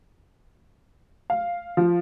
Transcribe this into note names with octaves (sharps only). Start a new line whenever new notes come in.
F5
F3